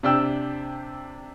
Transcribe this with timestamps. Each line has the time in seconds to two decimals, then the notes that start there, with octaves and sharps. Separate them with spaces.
0.03 C3 D4 G5 E6